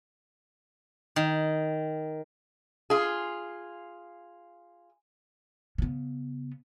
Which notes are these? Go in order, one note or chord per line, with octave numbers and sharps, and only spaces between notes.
D#3
F4 G#4
C#3 B3